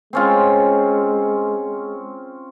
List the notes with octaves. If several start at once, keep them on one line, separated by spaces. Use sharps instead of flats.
G#3 C4 C#4 F4